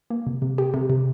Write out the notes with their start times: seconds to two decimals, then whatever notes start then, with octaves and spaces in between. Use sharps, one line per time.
0.10 A#3
0.27 C3
0.42 C3
0.58 G4
0.74 C3
0.90 C3